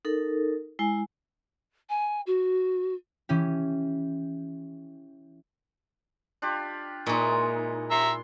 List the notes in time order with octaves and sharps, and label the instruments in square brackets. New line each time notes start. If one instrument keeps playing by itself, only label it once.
[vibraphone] D#4 A4 A#4
G#3 E4 G#5
[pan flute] G#5
F#4
[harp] E3 C#4 G4
[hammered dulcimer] D4 F4 G4
[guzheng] A#2 D#4 [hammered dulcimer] E3 G#3 C#6
[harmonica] E5 A#5 [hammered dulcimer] C6